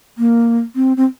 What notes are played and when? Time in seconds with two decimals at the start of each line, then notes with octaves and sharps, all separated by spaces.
0.18 A#3
0.75 C4
0.97 C4